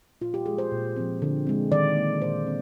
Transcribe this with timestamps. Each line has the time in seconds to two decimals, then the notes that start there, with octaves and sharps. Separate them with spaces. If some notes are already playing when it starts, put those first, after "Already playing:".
0.21 A#2 F4
0.34 G4
0.46 F3 G#3 G#4
0.58 C5
0.71 A#2
0.96 F3 C4
1.22 D3
1.47 G#3 C4
1.72 D#3 D5
1.97 A#3
2.22 A#2 C5
2.47 C4